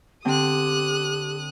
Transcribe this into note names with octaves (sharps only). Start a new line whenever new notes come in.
D3 C4 G4 D#6 F#6